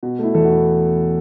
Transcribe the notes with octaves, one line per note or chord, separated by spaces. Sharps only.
B2 F#4
A3 E4
E2 A4
F#4
E4